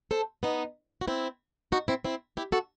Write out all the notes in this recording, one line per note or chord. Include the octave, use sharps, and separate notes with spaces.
A4 C5
B3 D#4
F#4
C4 E4
D#4 F#4
C4 E4
C4 E4
E4 G4
F#4 A4